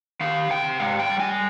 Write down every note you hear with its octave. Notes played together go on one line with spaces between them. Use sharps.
D#3 F5
C3 G5
G#2 F5
G5
G3
G#5